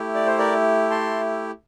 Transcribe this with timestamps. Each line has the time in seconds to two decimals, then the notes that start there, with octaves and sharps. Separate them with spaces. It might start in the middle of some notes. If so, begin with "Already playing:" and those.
Already playing: A3 E4 G4
0.15 D5
0.26 C5
0.39 A#4 D5
0.91 A5 C6